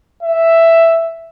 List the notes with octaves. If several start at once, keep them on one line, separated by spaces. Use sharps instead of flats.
E5